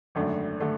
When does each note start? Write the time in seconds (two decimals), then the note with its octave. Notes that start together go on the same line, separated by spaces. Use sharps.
0.15 G#1 F#2 D3 A3 D4
0.60 D3 A3 D4